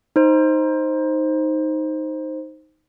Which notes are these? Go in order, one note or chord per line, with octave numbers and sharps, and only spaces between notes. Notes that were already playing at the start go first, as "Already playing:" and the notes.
D#4 C5